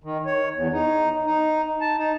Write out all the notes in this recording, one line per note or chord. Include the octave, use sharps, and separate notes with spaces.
D#3
C#5
E2
D#4
D#4
A5
D#4